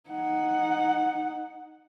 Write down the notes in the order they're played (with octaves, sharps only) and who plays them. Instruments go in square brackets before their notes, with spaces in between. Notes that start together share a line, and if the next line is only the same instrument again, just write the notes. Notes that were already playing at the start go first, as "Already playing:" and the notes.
[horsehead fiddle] D#4 F#5